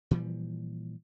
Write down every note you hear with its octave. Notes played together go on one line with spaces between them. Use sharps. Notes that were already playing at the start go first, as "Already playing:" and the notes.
A#2 E3 F3 G3